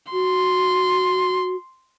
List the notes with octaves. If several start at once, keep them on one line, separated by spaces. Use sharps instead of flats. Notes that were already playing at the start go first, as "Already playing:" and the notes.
F#4 C6